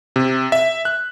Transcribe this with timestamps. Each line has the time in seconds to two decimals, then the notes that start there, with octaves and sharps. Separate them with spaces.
0.16 C3
0.52 E5
0.85 F#6